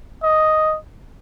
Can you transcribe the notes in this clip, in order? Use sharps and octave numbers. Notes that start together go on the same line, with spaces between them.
D#5